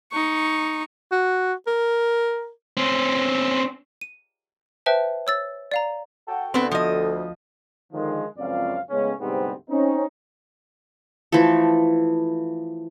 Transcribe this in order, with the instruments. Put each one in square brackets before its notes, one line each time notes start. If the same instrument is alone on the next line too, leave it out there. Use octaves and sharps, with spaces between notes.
[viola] D#4 C#6
[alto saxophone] F#4
A#4
[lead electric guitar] C4 C#4
[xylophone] D#7
B4 C5 E5 G5 A5
C#5 E6 A6
D5 F5 A#5
[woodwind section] F#4 A4 G5
[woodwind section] D2 [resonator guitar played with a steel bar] B3 C4
[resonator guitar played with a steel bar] F3 D#5
[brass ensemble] D3 D#3 F3 G#3
C#2 F#2 F3 C4 D5 F5
A2 C#3 G#3 B3 C#4
D2 G#2 C3 G3 B3 C4
C4 C#4 D#4
[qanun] E3 F3 A3 A4